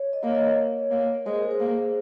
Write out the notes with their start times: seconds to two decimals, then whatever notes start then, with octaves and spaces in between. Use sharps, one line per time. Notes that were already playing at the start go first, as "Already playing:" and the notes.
Already playing: C#5
0.13 D#5
0.23 A#3 C#5
0.35 D#5
0.46 C#5
0.91 A#3
1.26 G#3 C5
1.34 A#4
1.43 G#4
1.51 C5
1.60 A#3